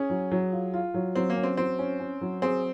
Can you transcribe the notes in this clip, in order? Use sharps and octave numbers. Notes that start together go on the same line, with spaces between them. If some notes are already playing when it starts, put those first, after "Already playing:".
Already playing: C#4 G#4
F#3
F#3
F4
F4
F#3
F#3 C4
A#3
C#4
C4
F#3 C4
C#4
C#4
F#3
C4 G#4